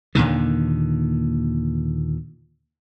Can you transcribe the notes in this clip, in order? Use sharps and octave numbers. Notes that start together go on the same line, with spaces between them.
D#2 A#2 D3 D#3